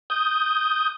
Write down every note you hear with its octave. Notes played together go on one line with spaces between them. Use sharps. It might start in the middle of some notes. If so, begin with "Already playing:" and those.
D#6 G6